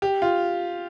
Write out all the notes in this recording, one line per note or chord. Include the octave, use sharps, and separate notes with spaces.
G4
F4